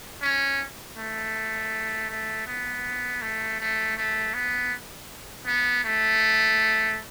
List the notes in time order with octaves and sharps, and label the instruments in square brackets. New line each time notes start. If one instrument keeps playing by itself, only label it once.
[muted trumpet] C#4
A3
A3
B3
A3
A3
A3
B3
B3
A3